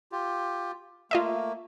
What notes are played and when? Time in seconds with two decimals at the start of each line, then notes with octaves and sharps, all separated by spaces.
0.12 F4 G4
1.11 A3 A#3 F4 D#5 E5